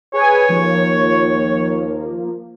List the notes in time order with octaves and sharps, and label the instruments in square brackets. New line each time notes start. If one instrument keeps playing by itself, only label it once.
[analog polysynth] G#4 B4 G#5 [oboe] C#5
[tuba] D#2 [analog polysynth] F3 A#3